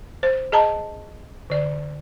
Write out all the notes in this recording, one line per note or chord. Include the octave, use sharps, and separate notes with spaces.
C5
G#4 D#5 A5 A#5
D3 D5